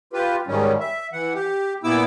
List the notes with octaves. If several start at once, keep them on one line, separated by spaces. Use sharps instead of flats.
F4 G4 B4
G#2 D#3 G3 C#4
E5
E3 F#5
G4
A#2 B3 E4 D6 E6